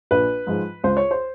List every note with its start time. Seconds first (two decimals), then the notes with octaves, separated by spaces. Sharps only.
0.11 A#1 B4
0.47 G#2 F3 G#3
0.84 C#2 C5
0.97 C#5
1.11 C5